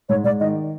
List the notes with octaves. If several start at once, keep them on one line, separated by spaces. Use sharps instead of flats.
G#2 C#5
G#2 D5
D#3 D#5